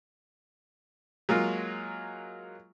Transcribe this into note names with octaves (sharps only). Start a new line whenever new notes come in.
F#3 G#3 A#3 F4